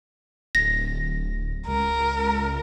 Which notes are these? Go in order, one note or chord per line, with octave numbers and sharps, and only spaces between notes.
D1 A#6
C#2 A#4